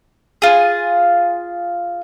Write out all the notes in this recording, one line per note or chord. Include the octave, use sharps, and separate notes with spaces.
F4 G#4